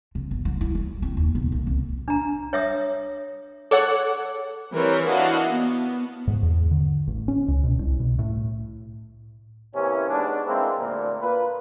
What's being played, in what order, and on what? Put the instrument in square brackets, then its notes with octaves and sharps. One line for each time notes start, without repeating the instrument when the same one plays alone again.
[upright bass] C3
G1
F#3
E4
F#3
C4
D#2
B1
A#2
C2
[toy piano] D4 A#5
C#5 E5 D#6
[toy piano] G#4 [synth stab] A4 C#5 F#5
[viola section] E3 G3 C4 A#4 B4 C#5
D4 E4 F#4 D#5 F5
B3
[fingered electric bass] G#2
E2
D3
A1
C#4
C#2
B2
C2
B2
A2
[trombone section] C3 E3 A#3 C#4
G#2 B3 D4
G#3 A#3 C4 D4 E4
D2 A#2
A#3 F4 B4